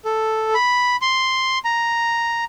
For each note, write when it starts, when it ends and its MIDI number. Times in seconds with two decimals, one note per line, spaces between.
0.05 0.54 69
0.54 0.96 83
1.02 1.59 84
1.65 2.45 82